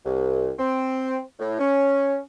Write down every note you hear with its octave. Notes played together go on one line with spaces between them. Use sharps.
C2
C4
A2
C#4